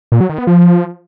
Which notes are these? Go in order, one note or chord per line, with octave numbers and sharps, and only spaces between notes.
A#2
F#3
D#3
B3
F3